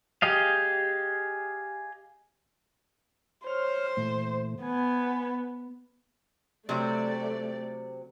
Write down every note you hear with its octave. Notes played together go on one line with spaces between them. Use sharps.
G4 G#4 D#5 F5
C5 C#5 F6
A#2 E3 A3
B3 G#5
C3 F#3 A3 C4 D5